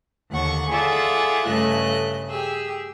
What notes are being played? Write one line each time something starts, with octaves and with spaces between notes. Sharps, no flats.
D#2 D3 F#5 C#6
F4 G#4 A4 D5 E5 F#5
G2 C#3 A3 A4 D#5 F#6
G4 G#4 E6